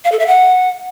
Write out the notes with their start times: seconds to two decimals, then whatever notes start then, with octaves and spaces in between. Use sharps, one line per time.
0.04 F5
0.12 A4
0.19 E5
0.27 F#5